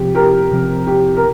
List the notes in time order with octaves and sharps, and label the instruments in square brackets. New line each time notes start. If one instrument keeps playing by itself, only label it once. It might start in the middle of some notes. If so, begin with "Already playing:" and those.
Already playing: [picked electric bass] C3 F3 C4 [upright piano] G4
[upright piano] G4 A#4
[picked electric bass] C3 F3 C4
[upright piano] G4
A#4